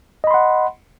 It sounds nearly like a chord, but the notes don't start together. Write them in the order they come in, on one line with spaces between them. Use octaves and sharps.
D#5 B5 C6 F#5